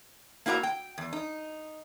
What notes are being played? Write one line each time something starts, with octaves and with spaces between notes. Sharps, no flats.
A#3 E4 F#4 D5 A#5
G5
E2
D#4